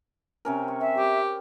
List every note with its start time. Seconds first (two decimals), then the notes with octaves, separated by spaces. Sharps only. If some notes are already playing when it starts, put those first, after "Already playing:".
0.45 C3 C#4 A#4
0.68 C#6
0.81 C4 E5
0.97 G4 C#5